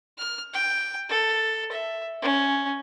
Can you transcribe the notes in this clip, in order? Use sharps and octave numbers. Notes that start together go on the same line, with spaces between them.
F6
G5
A4
E5
C#4